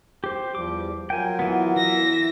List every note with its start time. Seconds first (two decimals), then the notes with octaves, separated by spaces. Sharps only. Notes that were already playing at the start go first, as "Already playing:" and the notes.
0.24 G4 C5
0.55 E2 F3 G3 D6
1.10 F#3 F4 A#4 G5 G#5
1.39 E3 B3
1.76 E3 E5 A#6